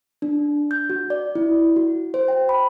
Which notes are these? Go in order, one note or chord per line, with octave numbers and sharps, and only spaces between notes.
D4
G6
F#4
D5
E4
F#4
C5
G5
B5